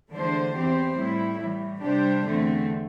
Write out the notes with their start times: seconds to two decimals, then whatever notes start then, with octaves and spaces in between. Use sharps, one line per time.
0.12 E2 D3 A3 D4 C5
0.54 E2 E3 C4 G4 C5
0.97 A2 G3 E4
1.39 A2 E3 G3
1.81 C3 G3 D4 G4 C5
2.24 E2 D3 A3 C4